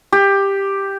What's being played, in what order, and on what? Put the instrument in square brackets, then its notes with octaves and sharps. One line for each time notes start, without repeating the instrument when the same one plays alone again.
[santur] G4